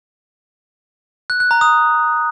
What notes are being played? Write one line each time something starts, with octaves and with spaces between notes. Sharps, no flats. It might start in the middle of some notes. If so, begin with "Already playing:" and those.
F#6
F#6
A#5
D#6